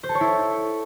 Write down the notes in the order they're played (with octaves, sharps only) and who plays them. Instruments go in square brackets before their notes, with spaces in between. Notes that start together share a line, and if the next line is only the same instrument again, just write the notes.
[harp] C5
A4
C#5
E4